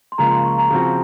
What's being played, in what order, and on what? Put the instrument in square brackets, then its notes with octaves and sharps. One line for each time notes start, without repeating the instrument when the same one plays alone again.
[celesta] C6
[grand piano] C#2 C#3 F3 A#3 F4 [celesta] A#5
[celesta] C6
C#6
A#5
[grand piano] C#3 F3 C4 F#4